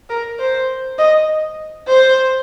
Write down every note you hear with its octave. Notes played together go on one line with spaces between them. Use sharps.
A#4
C5
D#5
C5